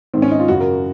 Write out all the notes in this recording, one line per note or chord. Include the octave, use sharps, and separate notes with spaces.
G#2 D#3 C4
C#4
D#4
F4
F#2 C#3 F#4
A#4